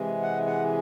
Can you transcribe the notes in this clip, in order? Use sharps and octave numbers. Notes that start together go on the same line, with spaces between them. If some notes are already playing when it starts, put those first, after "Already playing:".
Already playing: C3 E3 G#3
F#5
F#5